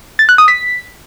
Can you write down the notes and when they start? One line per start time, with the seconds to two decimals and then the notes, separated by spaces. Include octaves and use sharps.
0.19 A6
0.29 F#6
0.38 D#6
0.48 B6